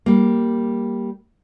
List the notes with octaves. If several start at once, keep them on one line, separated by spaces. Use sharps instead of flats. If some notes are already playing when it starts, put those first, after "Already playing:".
G3 A#3